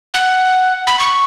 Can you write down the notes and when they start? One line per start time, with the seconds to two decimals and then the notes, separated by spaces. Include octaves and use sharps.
0.14 F#5
0.87 B5
0.99 C#6